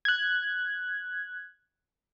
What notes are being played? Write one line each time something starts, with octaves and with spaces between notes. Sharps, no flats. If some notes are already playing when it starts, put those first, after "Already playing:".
F#6 G#6